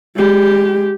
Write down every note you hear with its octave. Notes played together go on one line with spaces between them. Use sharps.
G#3 G4